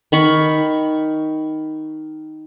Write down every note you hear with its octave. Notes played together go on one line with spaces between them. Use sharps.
D#3 B5 C#6